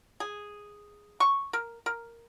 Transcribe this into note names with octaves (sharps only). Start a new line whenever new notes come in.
G#4
C#6
A#4
A#4